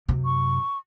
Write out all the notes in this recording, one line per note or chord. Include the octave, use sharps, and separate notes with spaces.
F#2 C3
C#6